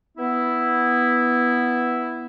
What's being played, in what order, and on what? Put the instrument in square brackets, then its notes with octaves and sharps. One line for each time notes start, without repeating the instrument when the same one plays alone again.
[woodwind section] B3 E4